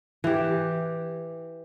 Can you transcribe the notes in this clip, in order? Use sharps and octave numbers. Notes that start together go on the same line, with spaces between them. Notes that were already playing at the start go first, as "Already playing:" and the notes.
E3 G4